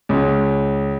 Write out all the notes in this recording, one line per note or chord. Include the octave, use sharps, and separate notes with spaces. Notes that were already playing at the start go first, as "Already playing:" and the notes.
C#2